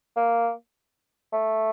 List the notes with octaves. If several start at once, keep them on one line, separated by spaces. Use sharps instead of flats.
A#3
A3